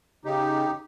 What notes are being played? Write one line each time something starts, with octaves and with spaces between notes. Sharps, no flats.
C#3 D#4 G4